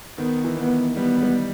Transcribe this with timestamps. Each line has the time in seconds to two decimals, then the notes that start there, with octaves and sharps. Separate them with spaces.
0.18 D#3 B3
0.45 E3
0.58 B3
0.96 G3 B3
1.23 G3